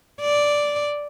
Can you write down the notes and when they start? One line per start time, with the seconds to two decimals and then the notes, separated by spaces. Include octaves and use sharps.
0.21 D5